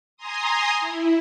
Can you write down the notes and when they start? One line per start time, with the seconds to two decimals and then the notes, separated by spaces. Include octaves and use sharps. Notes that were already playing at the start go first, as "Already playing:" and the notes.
0.17 G#5 A#5 C6 D#6
0.80 E4